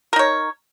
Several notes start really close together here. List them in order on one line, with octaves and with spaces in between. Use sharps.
A#4 D#4 C#5